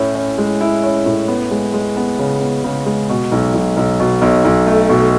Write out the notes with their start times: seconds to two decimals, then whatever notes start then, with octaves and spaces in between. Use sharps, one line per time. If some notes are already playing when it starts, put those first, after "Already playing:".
Already playing: A2 C#4 E4
0.15 C#4
0.38 G#3
0.61 E4
0.83 C#4
1.06 A2
1.28 B3
1.51 G#3
1.73 G#3
1.97 B3
2.19 C#3
2.41 B3
2.64 C#3
2.86 G#3
3.09 B2
3.32 B1
3.54 B1
3.77 B1
4.00 B2
4.22 B1
4.44 B1
4.67 A3
4.89 B2